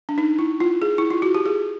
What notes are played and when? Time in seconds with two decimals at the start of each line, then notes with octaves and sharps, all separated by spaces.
0.09 D4
0.18 D#4
0.39 E4
0.60 F4
0.82 G#4
0.98 E4
1.10 F4
1.22 F#4
1.35 G4
1.46 G#4